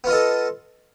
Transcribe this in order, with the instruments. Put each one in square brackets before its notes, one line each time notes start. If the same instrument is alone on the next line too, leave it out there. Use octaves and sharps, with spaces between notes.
[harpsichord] B3
F4
D#5
A4